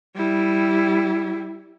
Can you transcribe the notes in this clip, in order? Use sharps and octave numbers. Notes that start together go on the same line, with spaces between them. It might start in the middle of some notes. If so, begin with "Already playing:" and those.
G3 E4